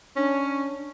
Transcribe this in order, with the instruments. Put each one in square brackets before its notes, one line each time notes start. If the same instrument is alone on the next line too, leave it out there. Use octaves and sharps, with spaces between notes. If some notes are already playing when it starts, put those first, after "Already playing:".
[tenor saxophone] C#4 [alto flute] D4